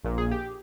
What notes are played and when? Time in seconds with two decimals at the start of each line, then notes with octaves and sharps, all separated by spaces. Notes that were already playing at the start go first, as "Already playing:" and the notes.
0.04 A#1 A#2
0.18 G#4
0.31 G4